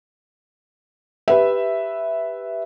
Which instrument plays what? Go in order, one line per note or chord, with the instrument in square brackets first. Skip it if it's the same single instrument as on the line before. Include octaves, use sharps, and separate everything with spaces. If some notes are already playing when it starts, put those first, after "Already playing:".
[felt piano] G4 B4 E5